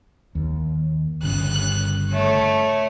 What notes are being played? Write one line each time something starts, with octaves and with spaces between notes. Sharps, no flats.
D#2
G1 C#3 F#6
A3 C#5